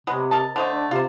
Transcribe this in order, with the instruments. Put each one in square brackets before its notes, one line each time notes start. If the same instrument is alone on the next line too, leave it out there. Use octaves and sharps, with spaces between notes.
[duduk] C3 [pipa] F#3 G#3 B3
[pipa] A#4 D#5 A5
[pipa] D3 A3 D#5 [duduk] C5
[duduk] D4
[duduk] C3 [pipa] F4 C5